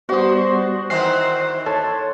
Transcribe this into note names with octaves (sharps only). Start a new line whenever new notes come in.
G3 B3 D4 F#4 C5 D#6
D#3 E3 C4 C5 F#5 C7
A4 C#5 A5 C6